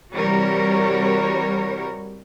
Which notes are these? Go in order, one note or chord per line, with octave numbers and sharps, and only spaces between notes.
C3 E3 G3 F#4 A#4 C#5